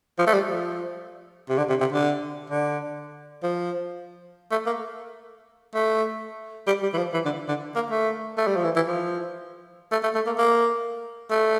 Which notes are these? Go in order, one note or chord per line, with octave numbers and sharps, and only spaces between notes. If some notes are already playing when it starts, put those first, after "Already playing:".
F3
A3
G3
F3
C3
D3
C3
C3
D3
D3
F3
A3
A#3
A3
G3
G3
E3
F3
E3
D3
D3
A#3
A3
A3
G3
F3
E3
E3
F3
A3
A3
A3
A#3
A#3
A3